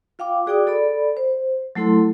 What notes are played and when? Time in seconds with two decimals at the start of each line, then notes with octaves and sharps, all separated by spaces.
0.19 F4 F5 G5 D6
0.47 F#4 G#4 D5 G5 D6 D#6
0.67 A4 D5 B5
1.17 C5
1.75 F#3 A3 E4 A4 C6